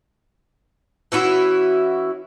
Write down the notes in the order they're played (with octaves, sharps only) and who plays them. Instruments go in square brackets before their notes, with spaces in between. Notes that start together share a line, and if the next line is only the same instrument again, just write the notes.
[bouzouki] E3 C#4 E4 F#4